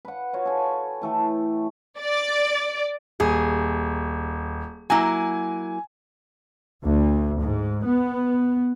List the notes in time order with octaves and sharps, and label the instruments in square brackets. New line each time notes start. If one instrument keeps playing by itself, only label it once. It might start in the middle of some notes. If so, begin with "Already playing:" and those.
[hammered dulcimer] B4 F#5
F4 F#4 C#5 F5
A4 G#5
E3 A3 A4 G5
[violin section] D5
[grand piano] D#1 [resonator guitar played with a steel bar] G#4
[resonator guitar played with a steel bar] F#3 A#3 E4 [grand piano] G#5
[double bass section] D2
G#2
B3